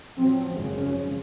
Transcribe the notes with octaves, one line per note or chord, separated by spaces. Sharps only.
A2 F3 F#3 C4
G#1 F#2 C#3 F3 C#4